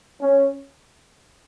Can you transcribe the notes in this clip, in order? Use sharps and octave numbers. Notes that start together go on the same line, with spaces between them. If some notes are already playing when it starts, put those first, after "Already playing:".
C#4